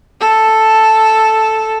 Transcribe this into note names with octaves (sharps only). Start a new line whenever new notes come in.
A4